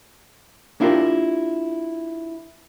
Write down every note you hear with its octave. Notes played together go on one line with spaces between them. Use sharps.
A#3 D4 E4 F4 G4 A#4